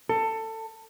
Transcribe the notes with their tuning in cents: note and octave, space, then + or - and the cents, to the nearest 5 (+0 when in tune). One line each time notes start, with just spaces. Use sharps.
A4 +20